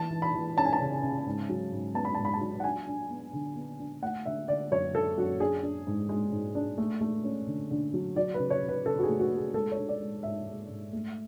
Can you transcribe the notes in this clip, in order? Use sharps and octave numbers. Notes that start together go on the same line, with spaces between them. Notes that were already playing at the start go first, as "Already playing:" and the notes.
Already playing: E3 A5
E3
B5
E3
C#4 A5
G#5
A5
C#3
C#3
G#2
F#3
G#2
B3 A5
B5
G#2 A5
B5
A5
F#3
F#5
D4 G#5
D4
B3
D3
B3
D4
A3 F#5
D3 E5
D3 D5
F#2 C#5
D3 A4
F#2 F#4
D4 G#4
D4
G#2
G#3
G#2
D4
A3
A3
C#4
D3
D3
F#3
F#3 D5
B4
C#3
C#5
C#3
B4
C#3 A4
F#4
G#4
A3
F#4
A3
G#4
G#3 A4
C#5
D4
D5
G#3
G#2 E5
G#3
G#2
A3